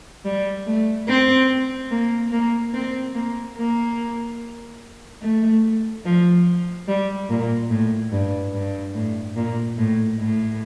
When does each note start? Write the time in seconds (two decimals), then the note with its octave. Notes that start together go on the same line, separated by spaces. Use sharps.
0.25 G3
0.67 A3
1.08 C4
1.91 A#3
2.32 A#3
2.74 C4
3.15 A#3
3.57 A#3
5.22 A3
6.05 F3
6.88 G3
7.30 A#2
7.71 A2
8.12 G2
8.53 G2
8.95 A2
9.36 A#2
9.78 A2
10.19 A2